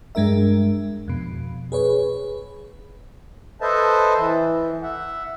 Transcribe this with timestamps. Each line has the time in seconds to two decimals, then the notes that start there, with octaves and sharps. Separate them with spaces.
0.15 G2 G#3 D4 A#4 E5
1.08 F2 B2
1.72 G#4 B4 C#5
3.60 A4 B4 C5 D#5 E5 A5
4.17 E3
4.83 E5 F#5